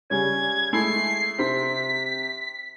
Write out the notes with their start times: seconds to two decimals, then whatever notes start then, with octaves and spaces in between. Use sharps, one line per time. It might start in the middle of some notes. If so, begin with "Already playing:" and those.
0.10 C#3 G3 C#4 G#6
0.73 G#3 A3 E4 C7
1.38 C3 C4 B6